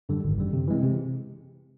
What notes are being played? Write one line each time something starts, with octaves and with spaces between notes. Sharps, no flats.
F#2 D3 G3
G#1
F#2 D3 G3
C3
E3 G#3 C4
C3